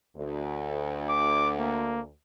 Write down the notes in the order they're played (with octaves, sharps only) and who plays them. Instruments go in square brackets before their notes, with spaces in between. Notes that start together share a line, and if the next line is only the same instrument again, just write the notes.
[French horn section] D2
[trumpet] D6
A#3